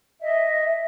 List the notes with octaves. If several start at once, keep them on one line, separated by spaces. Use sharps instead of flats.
D#5 E5